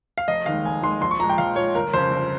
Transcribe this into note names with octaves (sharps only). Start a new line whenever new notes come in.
F5
F1 D#5
D#2 D#3 G#3 F5
F1 G#5
D#2 D#3 G#3 C6
A#1 C6
C#6
A#2 F3 G#3 A#5
G5
A#1 F5
A#2 F3 G#3 C#5
G1 A#4
F2 C#3 C5
G1